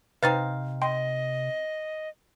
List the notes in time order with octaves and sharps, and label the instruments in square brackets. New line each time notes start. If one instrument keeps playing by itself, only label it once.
[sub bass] C3 [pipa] C4 D#4 F5 [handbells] B4 A6
[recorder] D#5 [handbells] G5 C6